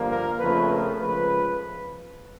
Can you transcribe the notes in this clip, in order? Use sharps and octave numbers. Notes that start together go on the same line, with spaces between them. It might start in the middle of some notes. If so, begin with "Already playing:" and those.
Already playing: G2 D3 F3 A#3
A#4
F2 C#3 F3 A3 B4
A#4
C#3 F3 G#3 B4